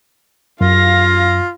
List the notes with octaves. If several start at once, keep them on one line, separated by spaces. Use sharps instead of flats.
F#2 F4 F5 A#6